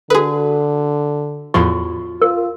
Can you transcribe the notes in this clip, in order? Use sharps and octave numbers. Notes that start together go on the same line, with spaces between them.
D3 F#4 G#4 A4 B4
E2 A2 F3 F4 F#4 C#6
F4 A#4